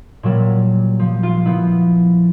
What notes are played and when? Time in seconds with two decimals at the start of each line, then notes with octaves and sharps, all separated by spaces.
0.23 A#2 F#3 G3
0.99 F3
1.23 F4
1.45 F3 B3 E4